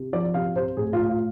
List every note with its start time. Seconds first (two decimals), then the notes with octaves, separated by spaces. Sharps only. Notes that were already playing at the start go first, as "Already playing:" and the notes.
Already playing: C3
0.13 F3 D5
0.34 C3 F5
0.56 C3 C5
0.77 A2 G#4
0.93 F4
0.99 A2
1.09 F4